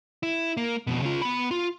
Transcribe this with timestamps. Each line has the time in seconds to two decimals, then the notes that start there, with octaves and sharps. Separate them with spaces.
0.23 E4
0.57 A#3
0.87 F2 B2
1.02 C#3 F4
1.22 B3 B5
1.51 F4